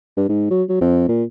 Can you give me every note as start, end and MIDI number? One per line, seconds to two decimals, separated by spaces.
0.17 0.25 43
0.29 0.49 44
0.51 0.63 54
0.69 0.78 54
0.81 1.07 41
1.09 1.24 46